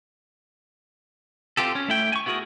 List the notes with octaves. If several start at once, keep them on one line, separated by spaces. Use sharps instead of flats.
C4 F4 G4 A4
C#4
A3 E4 G5
G#5 C#6
B3 E4 F#4 G#4 A#4